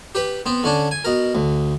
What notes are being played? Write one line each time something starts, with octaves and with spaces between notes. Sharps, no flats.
G4 B4
B3 C4
D3 C#4 D4
G#5
B2 A#4
D2